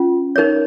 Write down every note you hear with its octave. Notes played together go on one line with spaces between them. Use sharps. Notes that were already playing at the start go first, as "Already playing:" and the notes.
Already playing: C#4 F4
D#4 A#4 C#5